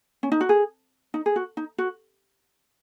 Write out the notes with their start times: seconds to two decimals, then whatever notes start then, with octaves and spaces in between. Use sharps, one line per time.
0.23 C#4
0.32 D#4
0.41 F#4
0.49 G#4
1.14 D#4
1.26 G#4
1.36 F#4
1.57 D#4
1.78 F#4